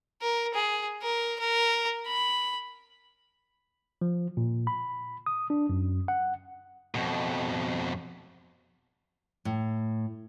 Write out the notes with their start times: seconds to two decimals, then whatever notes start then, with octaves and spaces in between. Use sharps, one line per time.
0.22 A#4
0.54 G#4
1.02 A#4
1.39 A#4
2.07 B5
4.01 F3
4.37 A#2
4.67 B5
5.26 D#6
5.50 D4
5.69 F#2
6.08 F#5
6.95 F2 B2
9.45 A2